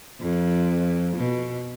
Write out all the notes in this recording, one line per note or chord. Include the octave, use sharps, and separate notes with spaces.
F2
B2